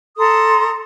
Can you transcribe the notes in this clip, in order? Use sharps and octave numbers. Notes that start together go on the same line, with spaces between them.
A4 A#5 C6 D#6